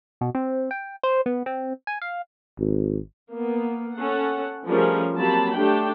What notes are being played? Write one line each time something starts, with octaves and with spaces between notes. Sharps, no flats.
B2
C4
G5
C5
B3
C4
G#5
F5
G#1
A#3 B3
C#4 A4 F#5
F3 G3 A3 C#4 G#4 A#4
F#3 A#3 C4 G4 A5 B5
A3 D4 G4 G5